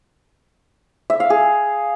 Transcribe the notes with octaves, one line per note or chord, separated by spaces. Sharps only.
E5
F5
G#4